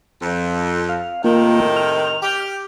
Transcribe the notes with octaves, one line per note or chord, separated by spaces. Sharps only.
F2
F5
A2 C3 D#3 A#3 F4
F6
G4